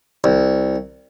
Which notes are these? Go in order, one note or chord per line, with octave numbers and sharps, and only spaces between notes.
C2